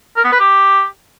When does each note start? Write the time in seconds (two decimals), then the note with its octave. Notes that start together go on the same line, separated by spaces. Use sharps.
0.17 A#4
0.25 B3
0.32 B4
0.40 G4